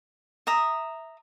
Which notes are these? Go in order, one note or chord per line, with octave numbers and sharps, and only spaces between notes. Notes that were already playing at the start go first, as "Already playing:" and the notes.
E5 A#5 D#6